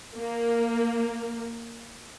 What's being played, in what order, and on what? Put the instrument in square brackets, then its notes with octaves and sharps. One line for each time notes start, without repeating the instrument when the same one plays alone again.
[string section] A#3